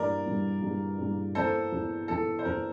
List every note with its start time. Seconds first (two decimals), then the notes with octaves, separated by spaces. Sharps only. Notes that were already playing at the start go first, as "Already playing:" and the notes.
Already playing: G2 E3 G3 A#3 A#4 D5
0.26 G2 E3 G3 A#3
0.62 G2 E3 G3 A#3
0.98 G2 E3 G3 A#3
1.35 E2 E3 A#3 A4 C5
1.72 E2 E3 A#3
2.08 E2 E3 A#3 A4
2.39 C5
2.45 E2 E3 A#3 A#4